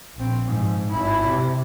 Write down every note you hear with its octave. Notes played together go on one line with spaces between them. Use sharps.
A#1 C4
G#2 F3
G#1 E4
C3